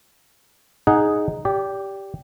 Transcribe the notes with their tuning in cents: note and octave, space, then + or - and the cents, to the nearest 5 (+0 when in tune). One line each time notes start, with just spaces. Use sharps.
D#4 +0 G#4 +0 F#5 +0
G4 +0 D5 -30